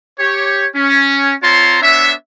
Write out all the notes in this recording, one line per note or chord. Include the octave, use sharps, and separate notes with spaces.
G4 C#5
C#4
C4 F4 C#5 A5 A#5 C6
B3 D4 C#5 E5